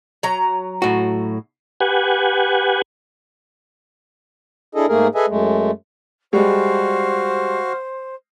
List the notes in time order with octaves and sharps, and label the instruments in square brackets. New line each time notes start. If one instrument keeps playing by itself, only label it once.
[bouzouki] F#3 A#5
[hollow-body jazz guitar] A2 F#4
[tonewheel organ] G4 B4 F#5 G#5
[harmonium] D4 E4 G#4 A4 D#5
G#2 A3 A#3 G#4 A#4
G#4 A4 B4 D#5 E5 G#5
F#2 G#3 A3
[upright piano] G3 G#3 [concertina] F#4 F5 [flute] C5